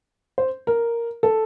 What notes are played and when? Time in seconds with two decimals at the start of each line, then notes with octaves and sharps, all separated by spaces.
0.38 C5
0.67 A#4
1.23 A4